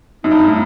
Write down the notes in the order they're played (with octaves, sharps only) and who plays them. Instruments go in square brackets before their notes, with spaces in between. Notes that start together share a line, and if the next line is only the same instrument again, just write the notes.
[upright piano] F#2 [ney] D#4
[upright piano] G2
A2